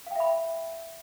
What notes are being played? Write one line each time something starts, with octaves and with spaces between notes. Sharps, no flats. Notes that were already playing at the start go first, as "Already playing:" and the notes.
E5 F5 G5 B5